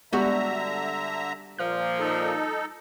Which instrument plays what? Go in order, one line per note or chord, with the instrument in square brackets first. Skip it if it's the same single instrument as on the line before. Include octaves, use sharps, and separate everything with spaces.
[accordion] D3 E5 A#5 [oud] G3 F#4 [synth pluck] G#3 B3 G4
[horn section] A#2 F3 [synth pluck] F6
[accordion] D#4 A4